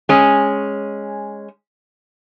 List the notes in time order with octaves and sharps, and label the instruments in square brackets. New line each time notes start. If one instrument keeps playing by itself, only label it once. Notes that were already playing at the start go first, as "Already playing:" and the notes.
[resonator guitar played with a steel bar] G#3 C#4